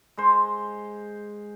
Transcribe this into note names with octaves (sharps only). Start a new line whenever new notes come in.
G#3 C5